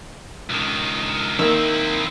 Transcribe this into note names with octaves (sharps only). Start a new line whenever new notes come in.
C#2 D#3
D#3 A#3 C4 E4